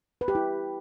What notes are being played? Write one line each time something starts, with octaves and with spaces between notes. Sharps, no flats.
B4
G4
E4